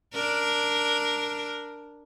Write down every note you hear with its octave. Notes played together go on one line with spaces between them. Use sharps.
D4 A#4